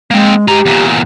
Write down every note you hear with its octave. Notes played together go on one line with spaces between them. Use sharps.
G#3 A#3 C4
G#3 G4 A#5
E2 A#2